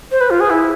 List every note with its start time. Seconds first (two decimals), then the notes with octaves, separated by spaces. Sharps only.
0.12 C5
0.21 B4
0.30 F4
0.40 G#4
0.50 E4